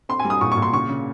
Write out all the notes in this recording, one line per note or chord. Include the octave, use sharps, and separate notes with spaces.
C4 C6
G#5
G3
D#6
A#2 C#6
C#6
A#2
C6
C#3 C#6
C#3